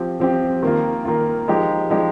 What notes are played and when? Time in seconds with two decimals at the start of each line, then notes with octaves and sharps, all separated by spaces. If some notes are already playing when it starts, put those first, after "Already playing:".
Already playing: F3 C4 G4
0.20 F3 C4 G4
0.63 D#3 A#3 F4
1.05 D#3 A#3 F4
1.48 F3 G#3 D#4 G4
1.90 F3 G#3 D#4 G4